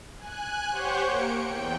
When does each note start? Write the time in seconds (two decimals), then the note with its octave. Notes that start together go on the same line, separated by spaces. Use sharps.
0.18 G#5 F#6
0.70 G4 C5 C#5 F#5 C#6 G6
1.05 A#3 C#7 D7
1.43 E2 G5